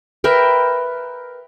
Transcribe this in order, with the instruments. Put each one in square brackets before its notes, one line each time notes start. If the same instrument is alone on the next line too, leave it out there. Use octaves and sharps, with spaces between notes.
[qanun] A#4 B4 E5 G5